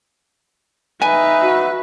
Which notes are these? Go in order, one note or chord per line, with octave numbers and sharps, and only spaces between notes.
D#4 B4 E5 G#5
F#4